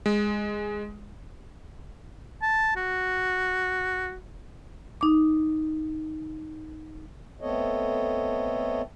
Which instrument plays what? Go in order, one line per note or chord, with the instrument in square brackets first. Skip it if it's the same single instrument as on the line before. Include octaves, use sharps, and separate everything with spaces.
[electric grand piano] G#3
[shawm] A5
F#4
[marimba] D#4 D6
[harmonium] A3 B3 C4 A4 C#5 D#5